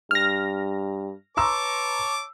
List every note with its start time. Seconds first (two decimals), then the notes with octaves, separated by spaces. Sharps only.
0.11 G2 F6 A#6
1.37 B4 C#5 A5 A#5 C6 D6 E6